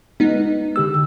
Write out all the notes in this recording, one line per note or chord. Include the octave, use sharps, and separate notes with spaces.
G#3 B3 D#4
D3 G4 E6